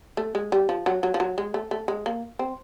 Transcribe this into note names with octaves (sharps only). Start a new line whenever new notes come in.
A3
G#3
G3
F3
F#3
F#3
F3
F#3
G#3
A3
A3
G#3
A#3
C4